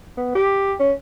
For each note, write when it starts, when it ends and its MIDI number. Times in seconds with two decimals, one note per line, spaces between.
0.17 0.32 59
0.35 0.73 67
0.80 0.93 61